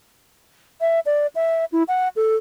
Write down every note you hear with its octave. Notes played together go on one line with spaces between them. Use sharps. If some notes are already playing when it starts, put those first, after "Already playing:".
E5
D5
E5
E4
F#5
A4